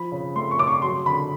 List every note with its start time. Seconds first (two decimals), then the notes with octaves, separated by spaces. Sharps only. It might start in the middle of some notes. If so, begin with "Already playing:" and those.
Already playing: F3 B5
0.12 C#3
0.35 A3 C6
0.51 C#6
0.59 C#3 D6
0.67 C#6
0.82 F#3 C6
1.06 D3 B5